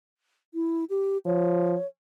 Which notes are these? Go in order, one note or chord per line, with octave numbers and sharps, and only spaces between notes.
E4
G4
F3 C#5